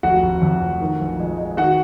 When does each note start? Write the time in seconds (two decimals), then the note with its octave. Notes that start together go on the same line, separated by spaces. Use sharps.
0.03 F1 F#4 F#5
0.23 F1
0.41 F2
0.61 F1
0.81 D#3
1.00 A#1
1.20 G#3
1.38 G#3
1.57 D#3 F#4 F#5